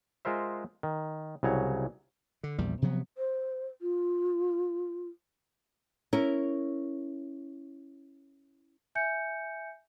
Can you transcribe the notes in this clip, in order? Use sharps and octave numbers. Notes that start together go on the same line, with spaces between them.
G#3 F4 A#4 C5 E5
D#3
C2 C#3 F#3 C#5
D3
A#1 E2 A#2 G3
C3 F3 F#3 B3
C5
F4
C#4 E4 A#4
E5 G#5 G6 C#7